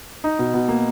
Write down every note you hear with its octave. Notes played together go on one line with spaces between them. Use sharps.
D#4
B2
B2
A#3